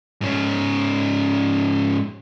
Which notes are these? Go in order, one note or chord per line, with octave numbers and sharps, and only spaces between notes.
G#2 C#4